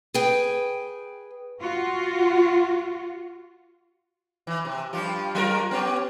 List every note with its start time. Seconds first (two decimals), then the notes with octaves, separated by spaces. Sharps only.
0.14 G#4 B4 G5
1.61 F4 F#4
4.47 E3
4.65 C3
4.93 G2 F3 G4
5.35 F#3 F4 A#4
5.71 B3 C#4 G4